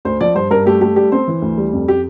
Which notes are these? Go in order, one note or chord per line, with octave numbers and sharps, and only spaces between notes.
D2 C5
F3 D5
G2 C5
G2 A#4
A3 G4
A3 G4
G3 G4
C4 C5
E3
D2
G3
F2
G4